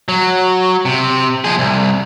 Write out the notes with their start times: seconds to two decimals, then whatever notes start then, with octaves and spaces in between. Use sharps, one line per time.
0.09 F#3
0.85 C3
1.44 F3 G#4
1.59 C2